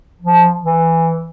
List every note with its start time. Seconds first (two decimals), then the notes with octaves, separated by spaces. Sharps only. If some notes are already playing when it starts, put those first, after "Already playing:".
0.21 F3
0.63 E3